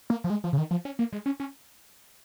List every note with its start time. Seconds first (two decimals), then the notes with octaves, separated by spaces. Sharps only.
0.10 A#3
0.24 F3
0.30 G#3
0.44 F3
0.53 C#3
0.58 D#3
0.71 F3
0.85 C#4
0.99 A#3
1.13 G#3
1.26 C#4
1.40 C#4